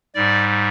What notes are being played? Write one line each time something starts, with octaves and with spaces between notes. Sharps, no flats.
G#2 G3 D5